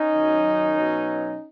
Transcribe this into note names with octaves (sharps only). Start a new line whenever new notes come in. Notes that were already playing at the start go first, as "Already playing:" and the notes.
Already playing: C#4 D#4
F#2 D#3 F#3
B2 F#3